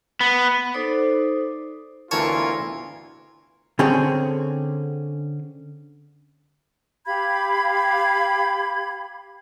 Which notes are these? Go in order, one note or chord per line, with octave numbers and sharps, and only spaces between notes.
B3
D#4 A4 C5 D5 D6 D#6
D2 E3 B3 E4 F4 A#4 C#5 A5
D3 C4 C#4 G#4
G4 F5 B5 G#6